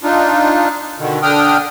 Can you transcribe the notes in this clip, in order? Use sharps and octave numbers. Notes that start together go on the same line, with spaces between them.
D4 D#4 F4
B2 D3 D#3
D3 D4 G5 D#6 F6